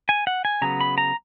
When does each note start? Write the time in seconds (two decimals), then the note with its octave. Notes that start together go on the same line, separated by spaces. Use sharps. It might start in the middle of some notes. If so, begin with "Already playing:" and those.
0.09 G#5
0.27 F#5
0.45 G#5
0.62 C#3 F#3 B3 A#5
0.81 B5
0.98 A#5